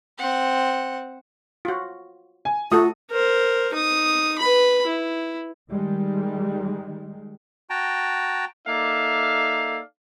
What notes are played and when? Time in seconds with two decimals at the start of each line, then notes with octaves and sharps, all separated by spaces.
0.18 C4 F#5
1.65 F4 F#4
2.45 G#5
2.72 A3 F4 F#4 A4 D#6
3.11 A#4 C5
3.74 D#4 D#6
4.39 B4 B5
4.86 E4
5.69 D#3 G3 G#3
7.70 F#4 G5 A5 A#5
8.67 A#3 D#4 A4 D5 E5 F5